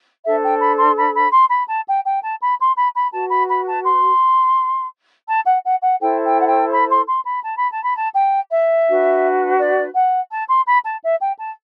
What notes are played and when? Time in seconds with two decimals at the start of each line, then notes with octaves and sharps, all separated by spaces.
0.25 D4 A4 C5 E5
0.43 G5
0.61 B5
0.79 C6
0.97 B5
1.16 B5
1.33 C6
1.50 B5
1.69 A5
1.87 G5
2.05 G5
2.23 A5
2.41 B5
2.58 C6
2.76 B5
2.95 B5
3.12 F#4 B4 A5
3.30 B5
3.49 B5
3.67 A5
3.85 C6
5.27 A5
5.46 F#5
5.64 F#5
5.82 F#5
5.99 E4 A4 C5 G5
6.23 G5
6.38 F#5
6.47 G5
6.72 B5
6.90 C6
7.08 C6
7.25 B5
7.44 A5
7.57 B5
7.71 A5
7.84 B5
7.96 A5
8.15 G5
8.51 E5
8.87 D4 F#4 B4
9.59 D5
9.95 F#5
10.30 A5
10.49 C6
10.66 B5
10.84 A5
11.02 E5
11.20 G5
11.39 A5